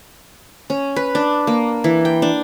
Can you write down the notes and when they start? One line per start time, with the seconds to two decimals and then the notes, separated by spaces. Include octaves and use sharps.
0.70 C#4
0.96 B4
1.15 D4
1.47 A#3
1.84 E3
2.05 G5
2.22 D4